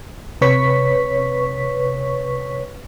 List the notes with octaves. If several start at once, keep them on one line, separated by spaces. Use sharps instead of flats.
C3 B4 C#5 C#6 B6